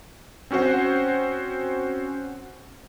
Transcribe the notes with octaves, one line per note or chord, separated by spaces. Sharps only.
C4 C#4 F#4 C5 F#5